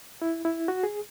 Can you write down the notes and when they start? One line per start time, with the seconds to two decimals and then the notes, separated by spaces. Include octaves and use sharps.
0.22 E4
0.45 E4
0.68 F#4
0.83 G#4